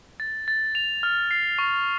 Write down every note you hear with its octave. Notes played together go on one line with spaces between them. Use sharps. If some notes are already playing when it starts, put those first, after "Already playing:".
A6
A6
F7
F6
C7
C#6